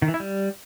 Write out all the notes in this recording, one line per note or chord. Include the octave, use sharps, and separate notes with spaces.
D#3
E3
E4
G3